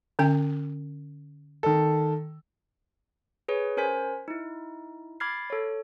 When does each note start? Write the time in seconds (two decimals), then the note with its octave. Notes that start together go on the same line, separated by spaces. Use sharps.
0.19 D3 C#4 G5
1.63 D#3 A4
3.48 G#4 B4 C#5
3.77 C#4 A#4 C5 G#5 B6
4.28 D#4 E4
5.20 B5 D6 F6 G#6 A6 C7
5.50 A4 C#5